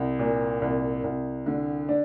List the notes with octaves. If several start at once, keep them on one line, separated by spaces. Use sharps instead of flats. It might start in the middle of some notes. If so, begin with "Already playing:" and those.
Already playing: C2
A#2
C2
C2
D3
D4